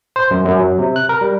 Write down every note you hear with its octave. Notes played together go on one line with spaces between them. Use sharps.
C5
F#2
F#2
F#3
C3
F#6
A#4
G3